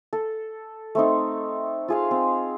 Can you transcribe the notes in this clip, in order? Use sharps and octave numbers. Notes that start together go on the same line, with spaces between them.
A4
A3 C4 D#4
F4 G#4 F5
C4